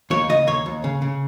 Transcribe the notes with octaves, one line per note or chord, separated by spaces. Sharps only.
D#2 C#5
C#3 D#5
D#2 C#5
D#2
C#3
C#3